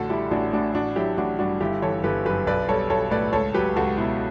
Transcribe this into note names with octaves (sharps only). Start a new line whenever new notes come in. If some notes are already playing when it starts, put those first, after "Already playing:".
Already playing: A1 D3 F#4 A4
G3 E4 G4
A1 D4 F#4
A2 D4 F#4
A1 D4 F#4
F#3 E4 G4
A1 D4 F#4
G2 D4 F#4
G1 E4 G4
E3 A4 C#5
G1 G4 B4
F#2 G4 B4
B1 B4 D5
G3 A4 C#5
B1 A4 C#5
A2 B4 D5
C#2 A4 C#5
F#3 G4 B4
C#2 F#4 A4
B2 E4